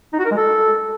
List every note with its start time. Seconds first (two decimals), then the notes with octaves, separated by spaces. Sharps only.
0.13 D#4
0.19 F#4
0.25 A#4
0.31 G#3
0.37 A4